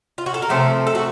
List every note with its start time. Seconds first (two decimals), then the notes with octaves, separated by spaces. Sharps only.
0.18 F4
0.26 F#4
0.34 A4
0.42 A#4
0.49 C3 F3 A3 A4 C5
0.87 A4
0.95 F#4